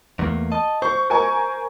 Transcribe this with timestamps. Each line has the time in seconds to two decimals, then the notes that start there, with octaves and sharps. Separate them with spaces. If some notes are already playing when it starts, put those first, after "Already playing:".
0.19 E2 A3 A#3
0.52 D#5 A5
0.82 C5 C#6
1.10 A#4 G#5 C#6